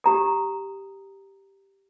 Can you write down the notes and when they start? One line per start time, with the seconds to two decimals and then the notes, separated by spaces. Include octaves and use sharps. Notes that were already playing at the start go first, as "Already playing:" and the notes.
0.04 G4 A#5 D#6